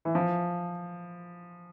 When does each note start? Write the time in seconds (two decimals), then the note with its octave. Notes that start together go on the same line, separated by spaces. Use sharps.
0.05 E3
0.15 F3